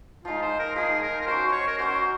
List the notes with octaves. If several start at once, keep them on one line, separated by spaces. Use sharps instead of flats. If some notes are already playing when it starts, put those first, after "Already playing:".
F3 G#3 D#4 F4
C5
A#4
F3 G#3 D#4 G#4
A#4
A#4
F#3 C#4 F#4 C5
C5
C#5
A#4
F#3 C#4 F#4 C5